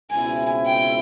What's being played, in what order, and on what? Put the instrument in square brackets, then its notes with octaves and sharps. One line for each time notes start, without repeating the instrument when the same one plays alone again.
[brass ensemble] C#2 B2 G#3 C4 E4 [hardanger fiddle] G#5
[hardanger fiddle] G5